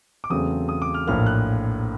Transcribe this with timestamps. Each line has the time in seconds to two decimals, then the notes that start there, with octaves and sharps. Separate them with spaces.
0.24 D6
0.30 E2 C#3 F#3 A3 C4 D#6
0.69 D#6
0.82 D6
0.94 F6
1.07 A#1 A2 F3 A#3 F6
1.26 F#6